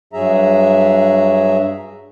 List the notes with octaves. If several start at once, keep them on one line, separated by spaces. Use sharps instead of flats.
G2 F#3 G#4 E5 A#5